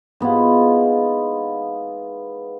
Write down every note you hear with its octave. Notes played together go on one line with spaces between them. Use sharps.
G#2 B3 E4 F4